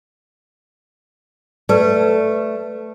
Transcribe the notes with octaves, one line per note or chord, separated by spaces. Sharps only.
A3 B4 D5